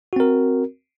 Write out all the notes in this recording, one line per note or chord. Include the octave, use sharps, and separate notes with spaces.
C4 F#4 A#4